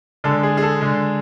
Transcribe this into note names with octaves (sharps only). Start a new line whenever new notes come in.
D3 G#3 A4
G#4
G#4
A4
D3 G#3